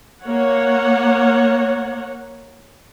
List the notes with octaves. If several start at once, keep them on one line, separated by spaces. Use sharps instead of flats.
A#3 C#5 F#5